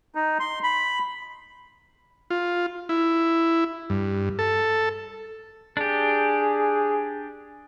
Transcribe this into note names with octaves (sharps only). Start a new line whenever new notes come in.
D#4
C6
B5
F4
E4
G2
A4
D4 G4 G#4